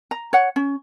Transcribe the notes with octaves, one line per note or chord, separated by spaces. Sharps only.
A#5
C#5 F#5
C#4